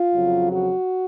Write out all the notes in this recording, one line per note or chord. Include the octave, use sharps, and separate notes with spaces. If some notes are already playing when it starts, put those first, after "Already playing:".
Already playing: F4
F2 C#3 F#3
F#4